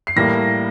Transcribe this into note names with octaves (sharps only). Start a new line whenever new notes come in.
C7
A2 G3 A#3 A#6